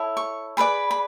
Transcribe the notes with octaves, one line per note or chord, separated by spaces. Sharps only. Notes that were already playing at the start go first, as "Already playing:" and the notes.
Already playing: E4 A4 C#5
C#6
G#4 B4 D5 B5
B5